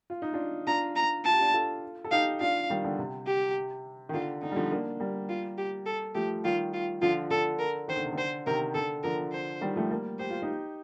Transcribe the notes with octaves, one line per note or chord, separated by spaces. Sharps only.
F4
D#4
D4 F4
D4 F4 A#5
A#5
F4 A5
G4
D4 F4
F4 A4
A4
D#4 G4 F5
D4 F4 F5
D#3 G3
D3
C3
G4
D#3
D3 F4
D3 D#4
G3
D3 F3
A#3 D4
G3 A#3
F4
G4
A4
F3 A3 G4
D#3 G3 F4
F4
D3 F3 F4
D3 A4
A#4
D#3 C5
D3
C3
D3
C5
C3 D#3 A#4
D3 A4
D3 F3 A#4
C5
D#3 G3
F3 A3
G3 A#3
G4 C5
F4
D#4 G4